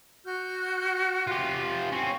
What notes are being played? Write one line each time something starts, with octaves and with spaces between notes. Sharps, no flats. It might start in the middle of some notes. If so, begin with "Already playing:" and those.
F#4 F6 G6
F4 G4
C4 C#4 C#6